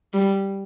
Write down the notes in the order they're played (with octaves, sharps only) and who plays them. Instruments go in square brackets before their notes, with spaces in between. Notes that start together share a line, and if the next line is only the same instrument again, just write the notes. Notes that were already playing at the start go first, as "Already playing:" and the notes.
[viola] G3